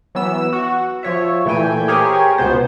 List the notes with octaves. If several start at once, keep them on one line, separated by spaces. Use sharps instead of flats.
E3 F#3 B3 E6
F#4
F3 C#5 E5
A#2 E3 A3 G5 G#5
G4 G#4 A#4 C5 C#5 G#5
C#2 B2 B3 C5